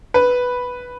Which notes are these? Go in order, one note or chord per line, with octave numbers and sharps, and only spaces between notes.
B4